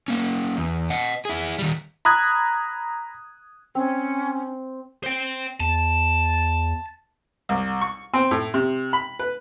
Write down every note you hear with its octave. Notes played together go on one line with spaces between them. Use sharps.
A#3 C#4
E2
D#5 F#5
E4 G#4
D#3 G3
A#5 B5 D#6 F#6 G#6
C4 C#4
C5 G5
E2 A5
C2
C#6
C4
A2
C3
B5
B4